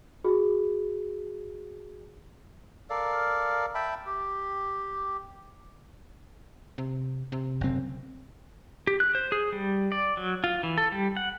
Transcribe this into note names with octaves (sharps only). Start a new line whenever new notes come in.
F#4 G#4
A4 A#4 D5 F5
E5 G5 A5 B5
G4
C3
C3
F#1 C4
G4
F#6
C5
G#4
G3
D5
F#3
F4
E3
A4
G3
F#5